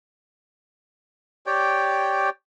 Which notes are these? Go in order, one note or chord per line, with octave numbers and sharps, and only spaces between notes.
G4 C#5 D5 G5